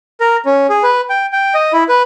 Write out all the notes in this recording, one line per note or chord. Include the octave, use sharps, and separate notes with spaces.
A#4
C#4
G#4
B4
G5
G5
D#5
E4
B4